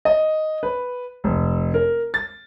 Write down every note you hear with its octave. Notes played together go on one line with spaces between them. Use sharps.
D#5
B4
F1
A#4
A6